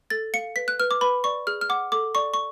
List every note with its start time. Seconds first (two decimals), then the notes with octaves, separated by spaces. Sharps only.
0.10 A4 A6
0.34 F5 C#7
0.56 B4 B6
0.68 F#6
0.80 B4 F6
0.91 D6
1.01 B4 B5
1.24 D5 C#6
1.47 G#4 F6
1.61 F6
1.69 F#5 D6
1.92 A4 D6
2.15 D5 C#6
2.34 C#6